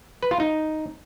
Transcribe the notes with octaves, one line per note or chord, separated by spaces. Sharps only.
B4
F4
D#4